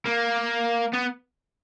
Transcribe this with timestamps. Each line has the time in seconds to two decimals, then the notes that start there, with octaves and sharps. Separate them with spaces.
0.06 A#3
0.93 B3